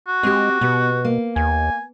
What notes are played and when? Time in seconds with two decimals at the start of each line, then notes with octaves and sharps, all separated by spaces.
0.08 F#4
0.23 G#3 C4 G4
0.61 B2 B3
1.05 A#3
1.36 D#2 G#5